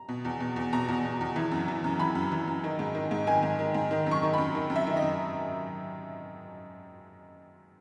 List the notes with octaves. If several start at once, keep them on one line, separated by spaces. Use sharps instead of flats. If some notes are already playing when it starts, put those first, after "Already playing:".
Already playing: A#5
B2
E2
B2
E2
B2 A#5
E2
B2
E2
E3
F#2
E3
F#2
E3 B5
F#2
E3
F#2
D#3
G#2
D#3
G#2
D#3 G#5
G#2
D#3
G#2
D#3
F#2 C#6
D#3
F#2 B5
D#3
F#2
E5
D#3
D#5
F#2